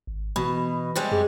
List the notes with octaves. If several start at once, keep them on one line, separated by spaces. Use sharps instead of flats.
G#1
B2 E3 B5
C3 G3 G#3
F#2 G#4